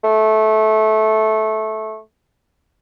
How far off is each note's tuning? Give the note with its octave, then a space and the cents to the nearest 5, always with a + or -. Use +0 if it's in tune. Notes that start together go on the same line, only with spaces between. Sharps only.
A3 -15